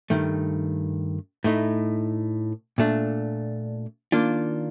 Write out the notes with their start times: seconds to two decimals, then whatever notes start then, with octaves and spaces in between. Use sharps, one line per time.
0.10 G2 D#3 A3
1.44 A2 A3 D#4
2.78 A#2 A3 D4
4.12 D#3 A#3 D4 F4